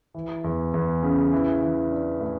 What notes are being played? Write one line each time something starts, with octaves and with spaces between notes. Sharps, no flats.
E3
E2
E2
C#3
E3
E3
D4
A2